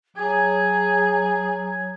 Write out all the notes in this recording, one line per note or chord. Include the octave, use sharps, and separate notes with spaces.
F#3 G#4 G#6